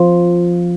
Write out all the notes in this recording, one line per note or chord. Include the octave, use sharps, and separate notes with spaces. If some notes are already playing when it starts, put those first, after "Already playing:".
Already playing: F3